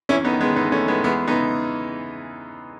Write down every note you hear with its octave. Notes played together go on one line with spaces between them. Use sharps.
E2 C#4 E4
B3 D#4
D#3
G#3 B3
E2 B3 D#4
A3 C#4
D#3
G#3 B3
E2 G#3 B3
C#3 E3 B3 D#4